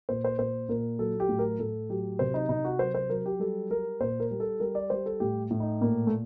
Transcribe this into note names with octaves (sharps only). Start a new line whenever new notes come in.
A#2 C5
C5
A#2 C5
A#2 A#4
F#3 A4
G4
A2
A#4
A2 A4
F#3 G4
C3 C5
D#4
C3 D#4
F#4
F#3 C5
C5
F#3 A#4
G4
G3 A4
G3 A#4
A#2 C5
A#4
G3
A4
G3 A#4
D5
G3 C5
A4
A2 G4
A2
D#4
A#2 A#3
A3